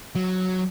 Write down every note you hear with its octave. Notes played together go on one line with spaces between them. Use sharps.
F#3